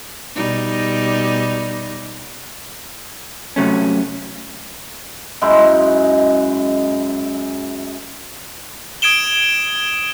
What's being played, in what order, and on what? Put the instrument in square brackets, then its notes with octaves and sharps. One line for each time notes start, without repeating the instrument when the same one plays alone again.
[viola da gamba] B2 G3 D#4
[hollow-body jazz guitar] C3 F#3 A3 C#4
[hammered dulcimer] F#2 G#3 D#4 E4
[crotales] D#6 G#6 D7 E7 G7